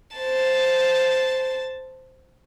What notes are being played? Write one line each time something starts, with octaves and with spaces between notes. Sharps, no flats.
C5 A5